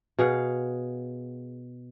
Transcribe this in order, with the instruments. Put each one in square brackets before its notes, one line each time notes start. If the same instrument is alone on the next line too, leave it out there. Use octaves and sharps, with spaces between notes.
[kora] B2 G#4 F5 F#5